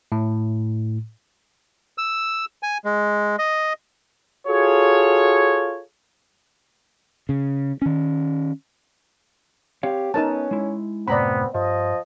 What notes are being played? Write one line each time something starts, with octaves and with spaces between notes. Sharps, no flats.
A2
E6
G#5
G#3
D#5
F4 F#4 G#4 A4 C#5
C#3
D#3 C#4
C4 G4 C#5 F5
B3 C#4 D#4 A#4 A5
G#3 E4
C2 F#2 A2 B3 C4 D5 A#5 B5
G2 F3 D#5